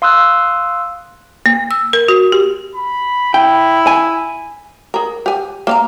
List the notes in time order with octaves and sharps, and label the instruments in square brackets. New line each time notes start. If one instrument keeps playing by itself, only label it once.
[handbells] F5 C6 D#6 E6 F#6
[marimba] A#3
E6
A#4
F#4
G4
[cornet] B5
[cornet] E4 [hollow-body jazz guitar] G5
[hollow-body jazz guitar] G#5
[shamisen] G#4 A#4
G4 G#5
A#3 F5 A#5